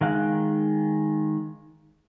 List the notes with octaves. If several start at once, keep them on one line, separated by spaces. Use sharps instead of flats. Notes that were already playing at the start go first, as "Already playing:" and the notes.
D#3 G#3 F5 F#6